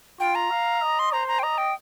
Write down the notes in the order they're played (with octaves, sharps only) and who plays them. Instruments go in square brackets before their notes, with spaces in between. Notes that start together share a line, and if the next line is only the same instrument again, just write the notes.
[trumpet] F4 [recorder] G5
[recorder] A#5
[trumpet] F5
D#5
[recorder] C6
[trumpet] C5 [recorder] A#5
[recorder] A#5
G5
[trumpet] D#5 [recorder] A#5
[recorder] G5